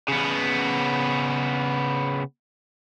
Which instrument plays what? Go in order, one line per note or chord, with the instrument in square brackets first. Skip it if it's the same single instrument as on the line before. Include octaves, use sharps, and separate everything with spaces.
[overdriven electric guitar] C#3 B3